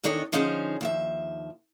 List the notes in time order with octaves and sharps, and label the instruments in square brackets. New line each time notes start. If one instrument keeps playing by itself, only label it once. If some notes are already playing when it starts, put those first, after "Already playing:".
[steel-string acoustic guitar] E2 D#3 D4 A4 C#5 D#5
D3 F3 C#4 D#4 G#4 C5
D#2 F3 E5